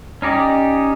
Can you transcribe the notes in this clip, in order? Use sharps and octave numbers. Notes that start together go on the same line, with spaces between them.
C#4 D#4 G4 D5